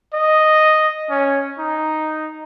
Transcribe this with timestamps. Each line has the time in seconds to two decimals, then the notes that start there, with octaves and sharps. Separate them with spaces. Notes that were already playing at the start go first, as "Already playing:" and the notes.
0.14 D#5
1.10 C#4
1.59 D#4